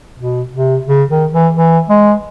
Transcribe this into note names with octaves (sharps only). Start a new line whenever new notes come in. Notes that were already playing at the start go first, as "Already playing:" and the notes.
B2
C3
C#3
D#3
E3
E3
G#3